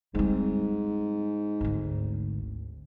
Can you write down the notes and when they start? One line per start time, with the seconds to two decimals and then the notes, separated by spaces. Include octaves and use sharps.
0.15 G#2 G3 C4
1.61 G#1 D2